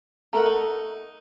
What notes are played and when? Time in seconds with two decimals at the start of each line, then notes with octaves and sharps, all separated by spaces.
0.33 A3 A4 A#4 F#5 A#5
0.46 D#4